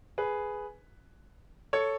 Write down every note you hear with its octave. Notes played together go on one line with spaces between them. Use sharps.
G#4 B4
A4 C#5